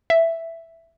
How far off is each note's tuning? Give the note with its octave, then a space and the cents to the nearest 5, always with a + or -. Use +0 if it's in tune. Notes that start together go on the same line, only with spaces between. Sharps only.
E5 +5